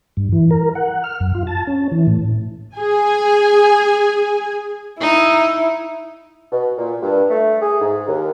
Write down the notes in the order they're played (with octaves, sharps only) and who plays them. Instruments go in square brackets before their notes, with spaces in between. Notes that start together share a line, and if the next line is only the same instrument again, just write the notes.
[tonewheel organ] G2
E3
A#4
F#5
F6
F#2
F4
A5
C#4
E3
A2
[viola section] G#4 G#5
[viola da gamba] D#4 [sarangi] E4
[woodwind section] B2
A#2
G2
A3
G#4
G#2
D#2